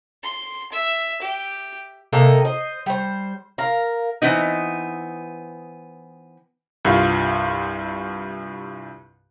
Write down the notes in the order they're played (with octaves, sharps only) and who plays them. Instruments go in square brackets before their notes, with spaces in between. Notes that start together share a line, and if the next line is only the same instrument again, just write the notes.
[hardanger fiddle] C6
E5
G4
[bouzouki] C3 A#3 D#4 A4
C5 D#5
G3 C5
A#4 F5
[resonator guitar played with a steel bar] E3 B3 C4 D#4
[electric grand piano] C2 G2 F4 F5 C6